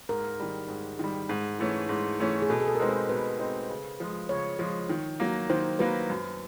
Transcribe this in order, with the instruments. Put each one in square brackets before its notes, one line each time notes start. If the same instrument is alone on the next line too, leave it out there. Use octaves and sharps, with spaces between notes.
[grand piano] G#2 [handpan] A#4
[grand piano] D#3 G3
G#2
D#3 G3
G#2
E3 A3 C#4
G#2
E3 A3 C#4
[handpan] G#4
[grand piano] B2 [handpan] A4
[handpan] G#4
A4
A#4
[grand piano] G#3 C4 D#4 [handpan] B4
[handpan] C5
[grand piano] B2 [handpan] B4
[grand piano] G#3 C4 D#4
C#3
F3 G#3
[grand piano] C#3 [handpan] C#5
[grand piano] F3 G#3
D#3
F#3 A#3
[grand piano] D#3 [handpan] C5
[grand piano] F#3 A#3 [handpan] B4
[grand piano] F#2